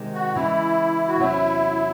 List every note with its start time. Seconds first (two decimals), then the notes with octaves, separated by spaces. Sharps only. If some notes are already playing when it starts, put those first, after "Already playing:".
Already playing: C3 D#3 G#3
0.14 F#4
0.35 C#3 E3 G#3 E4
1.08 F#4
1.20 E2 C3 F#3 C#4 E4